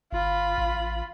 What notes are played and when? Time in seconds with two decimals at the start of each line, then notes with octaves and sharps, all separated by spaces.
0.13 G1 F4 B5
0.58 A1